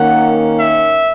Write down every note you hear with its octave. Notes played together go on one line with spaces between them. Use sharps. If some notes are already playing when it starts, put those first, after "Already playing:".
Already playing: D#3 A#3 C#4 F#5
E5